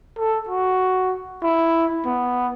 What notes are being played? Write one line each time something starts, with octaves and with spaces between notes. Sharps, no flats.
A4
F#4
E4
B3